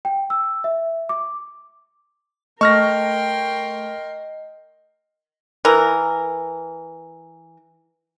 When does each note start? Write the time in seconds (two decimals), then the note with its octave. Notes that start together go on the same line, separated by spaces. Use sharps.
0.05 G5
0.30 E6
0.64 E5
1.09 D6
2.61 A3 A#4 D#5 G5 C6 C#6 F6 A#6
5.65 E3 A#4